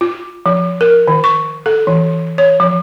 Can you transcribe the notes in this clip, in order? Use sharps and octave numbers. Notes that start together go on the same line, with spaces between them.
F4
F3
A#4
D#3
C#6
A4
E3
C#5
F3